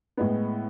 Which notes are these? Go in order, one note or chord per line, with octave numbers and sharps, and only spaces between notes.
A2 G#3 B3